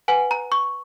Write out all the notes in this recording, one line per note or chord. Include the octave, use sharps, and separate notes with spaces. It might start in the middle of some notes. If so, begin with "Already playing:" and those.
B4 F#5 G#5
A#5
C#6